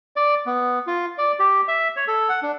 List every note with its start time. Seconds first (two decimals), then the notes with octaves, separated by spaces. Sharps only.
0.16 D5
0.46 B3
0.87 F4
1.18 D5
1.39 G4
1.68 E5
1.96 C#5
2.08 A4
2.29 F#5
2.43 D4